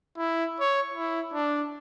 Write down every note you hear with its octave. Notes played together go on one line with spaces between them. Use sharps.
E4
C#5
E4
D4